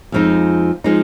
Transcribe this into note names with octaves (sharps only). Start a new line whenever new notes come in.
F2 F3 G#3 D#4
F3 G#3 D#4